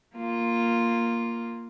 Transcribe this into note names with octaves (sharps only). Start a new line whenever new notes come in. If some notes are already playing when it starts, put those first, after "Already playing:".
A#3 F4